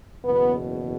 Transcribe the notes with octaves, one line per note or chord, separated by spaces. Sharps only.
F#1 E2 B2 B3